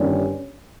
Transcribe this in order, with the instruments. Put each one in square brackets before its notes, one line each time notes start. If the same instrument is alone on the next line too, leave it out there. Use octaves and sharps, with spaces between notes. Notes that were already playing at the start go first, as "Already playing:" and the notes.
Already playing: [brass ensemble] G1 G2 D#3 G3 C#4